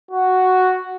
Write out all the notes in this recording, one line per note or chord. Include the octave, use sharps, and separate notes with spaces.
F#4